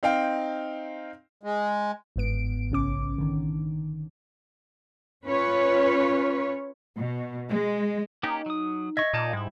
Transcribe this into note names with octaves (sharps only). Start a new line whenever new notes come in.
C4 D#4 F5 G5
G#3
G1 G#2 B3 D7
A#1 C#3 C#4 D6
D3 D#3
C#4 F4 B4 C#5
B2
G#3
A#3 C#4 D#4 G4
F#3 D#6
D#5 E5 C#6 G#6 A#6
A#2 D#4 D5 A5
G#2 G3 E4